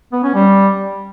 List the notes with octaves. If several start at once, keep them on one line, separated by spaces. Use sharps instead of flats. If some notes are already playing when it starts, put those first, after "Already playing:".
B3
C#4
G3